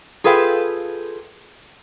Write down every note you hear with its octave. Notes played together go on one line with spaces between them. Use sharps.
F4 G#4 A4 B4 F5 G5